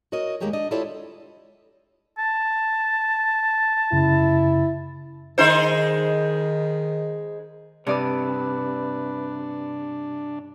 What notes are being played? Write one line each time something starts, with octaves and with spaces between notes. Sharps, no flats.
F#4 A#4 C#5 D#5
D#2 G#3 A#3 G4 G#4 C#5
D4 D#5
E4 F4 G4 A4 C#5 D5
A5
F#2 C#3 E4
D#3 G#3 D#4 C5
G2 C3 D4 B4 D5 D#6